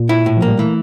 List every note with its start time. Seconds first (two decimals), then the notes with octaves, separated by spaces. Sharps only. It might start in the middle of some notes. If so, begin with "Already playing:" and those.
Already playing: A#2
0.09 E4
0.26 A2
0.37 F3 A#3
0.47 G3
0.58 E3 A3